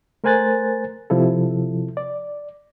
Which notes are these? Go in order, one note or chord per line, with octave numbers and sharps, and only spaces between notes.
A3 A#4 C5 G#5 F#6 A6
C3 F3 E4 A4
D5